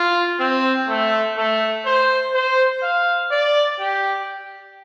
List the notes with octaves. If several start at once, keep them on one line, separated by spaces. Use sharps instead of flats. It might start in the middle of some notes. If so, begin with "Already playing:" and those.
Already playing: F4
C4
A3
A3
C5
C5
F5
D5
G4